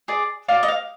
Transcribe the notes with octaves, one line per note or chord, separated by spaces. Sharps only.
G#4 D5
F#4 D5 F5
D#5
F5